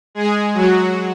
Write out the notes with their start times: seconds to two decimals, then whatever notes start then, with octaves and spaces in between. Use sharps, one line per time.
0.15 G#3 G#4
0.54 F#3 F#4